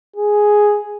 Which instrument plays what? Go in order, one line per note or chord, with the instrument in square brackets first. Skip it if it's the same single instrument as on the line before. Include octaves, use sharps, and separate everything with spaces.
[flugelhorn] G#4